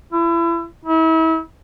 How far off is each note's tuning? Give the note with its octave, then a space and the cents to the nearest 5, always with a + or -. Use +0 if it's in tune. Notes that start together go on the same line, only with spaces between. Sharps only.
E4 +35
E4 -35